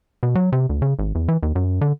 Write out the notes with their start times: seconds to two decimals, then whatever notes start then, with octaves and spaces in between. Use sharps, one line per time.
0.23 B2
0.35 F#3
0.52 C3
0.69 D2
0.82 C#3
0.99 G#1
1.15 E2
1.28 E3
1.43 D#2
1.55 F#2
1.81 D3